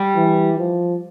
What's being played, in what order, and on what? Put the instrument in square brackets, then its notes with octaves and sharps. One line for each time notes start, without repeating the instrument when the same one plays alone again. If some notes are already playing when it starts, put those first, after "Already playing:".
Already playing: [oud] G3
[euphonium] E3
F3